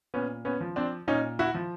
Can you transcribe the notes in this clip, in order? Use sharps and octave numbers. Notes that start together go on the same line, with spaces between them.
A#2 B3 C#4
B3 C#4
F3
C4 D4
A#2 C#4 D#4
E4 F#4
F3